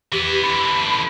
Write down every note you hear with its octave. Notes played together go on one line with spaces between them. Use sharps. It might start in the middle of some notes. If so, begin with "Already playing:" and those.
E3 B3 G4
D3 E3 B5